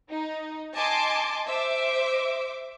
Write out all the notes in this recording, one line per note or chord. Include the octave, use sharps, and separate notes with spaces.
D#4
D#5 G#5 A5 C6 D6
C5 E5 D6